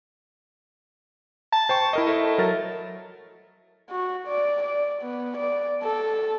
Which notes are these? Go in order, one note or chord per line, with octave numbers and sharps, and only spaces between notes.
A5
C5 G5 C#6
E4 A#4 D#5
A3
F#3 A#4 A6
F#4
D5
D5
B3
D5
A4